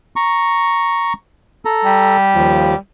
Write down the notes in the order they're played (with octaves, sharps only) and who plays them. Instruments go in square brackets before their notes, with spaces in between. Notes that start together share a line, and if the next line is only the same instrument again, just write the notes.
[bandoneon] A#5 C#6
A4 A#5
[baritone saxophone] G3
[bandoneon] D#2 F3